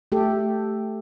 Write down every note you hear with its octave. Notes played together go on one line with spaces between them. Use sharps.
A3 G4 A4